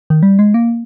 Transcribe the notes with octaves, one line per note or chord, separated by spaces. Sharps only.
D#3
G3
G#3
A#3